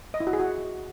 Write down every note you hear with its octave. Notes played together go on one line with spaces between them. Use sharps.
D#5
E4
F#4
G#4
F#4